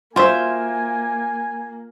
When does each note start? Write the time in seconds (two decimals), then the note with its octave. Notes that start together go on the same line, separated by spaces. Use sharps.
0.16 A#3 F4 F#4 C5 E5 G#5